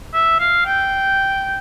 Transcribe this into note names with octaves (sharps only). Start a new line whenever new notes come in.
E5
F5
G5